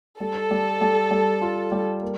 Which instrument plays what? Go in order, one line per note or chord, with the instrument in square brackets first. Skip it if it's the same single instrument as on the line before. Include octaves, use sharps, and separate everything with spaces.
[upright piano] G3 [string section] A4
[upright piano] G3
G3
G3
F4
G3
A#3